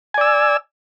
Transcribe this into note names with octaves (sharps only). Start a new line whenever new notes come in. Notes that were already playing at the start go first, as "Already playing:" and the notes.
D5 G#5 E6